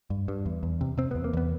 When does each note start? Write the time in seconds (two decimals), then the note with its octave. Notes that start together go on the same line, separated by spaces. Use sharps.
0.10 G2
0.28 G2
0.46 E2
0.63 E2
0.81 C3
0.97 C3 C4
1.11 E2 B3
1.24 A#3
1.33 E2 B3